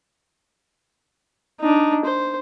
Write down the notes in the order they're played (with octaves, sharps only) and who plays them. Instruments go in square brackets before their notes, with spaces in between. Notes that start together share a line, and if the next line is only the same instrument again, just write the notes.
[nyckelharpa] D4 D#4
C5